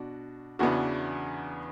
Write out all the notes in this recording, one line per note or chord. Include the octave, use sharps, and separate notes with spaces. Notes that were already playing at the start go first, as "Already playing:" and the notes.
Already playing: B2 D4 F#4
E2 C#3 E3 B3 D4 F#4